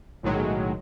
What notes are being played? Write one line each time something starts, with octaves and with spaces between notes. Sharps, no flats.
B1 A2 D#3 F#3 G#3